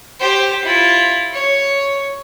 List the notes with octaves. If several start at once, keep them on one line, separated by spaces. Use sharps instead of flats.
G4 C5
E4 F4
C#5